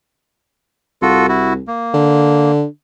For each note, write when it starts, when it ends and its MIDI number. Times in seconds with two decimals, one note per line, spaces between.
1.02 1.61 36
1.02 1.27 65
1.02 1.27 66
1.02 1.27 69
1.29 1.53 64
1.29 1.53 66
1.68 2.52 58
1.94 2.65 50